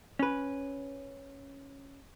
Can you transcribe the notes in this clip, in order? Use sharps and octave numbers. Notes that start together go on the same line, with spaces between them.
C#4 B4